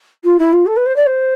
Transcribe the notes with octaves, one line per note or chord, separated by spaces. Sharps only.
F4
E4
F4
A4
B4
C5
D5
C5